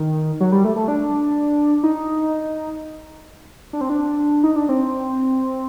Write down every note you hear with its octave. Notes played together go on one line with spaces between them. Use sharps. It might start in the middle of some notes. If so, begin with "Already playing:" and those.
Already playing: D#3
F#3
G3
A3
A3
D4
D#4
D4
C4
D4
D#4
D4
C4